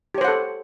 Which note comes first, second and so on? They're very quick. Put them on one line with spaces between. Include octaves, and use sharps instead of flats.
G4 C#5 C5 F#5 A4